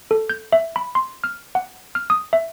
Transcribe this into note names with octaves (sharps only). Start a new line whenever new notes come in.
A4
G6
E5
B5
C6
F6
F#5
F6
D#6
E5